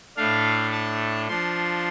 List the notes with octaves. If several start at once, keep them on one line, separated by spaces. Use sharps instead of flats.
A2 A3 D4 F5
A5
F3 D4 C6